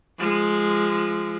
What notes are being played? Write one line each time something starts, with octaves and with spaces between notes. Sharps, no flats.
F3 G#3